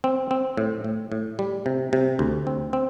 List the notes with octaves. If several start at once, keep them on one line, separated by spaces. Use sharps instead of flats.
C4
C4
A2
A2
A2
G3
C3
C3
D2
C4
C4